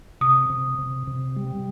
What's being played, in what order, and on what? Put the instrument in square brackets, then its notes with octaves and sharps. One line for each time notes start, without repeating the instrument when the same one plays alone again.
[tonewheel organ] C3 [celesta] D#6
[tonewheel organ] C3
C3
C3
G3